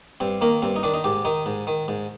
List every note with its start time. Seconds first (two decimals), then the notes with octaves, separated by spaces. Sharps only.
0.20 G2 C4
0.41 D#3 A#3
0.62 G2 C4
0.76 D#4
0.83 D#3 D4
0.94 D#4
1.04 G#2 G4
1.25 D#3 D#4
1.46 G#2
1.67 D#3
1.88 G#2